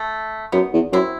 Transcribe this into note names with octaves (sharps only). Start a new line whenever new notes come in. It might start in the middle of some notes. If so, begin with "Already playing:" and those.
Already playing: A3
F#2 B3 D#4
E2
F#2 C4 E4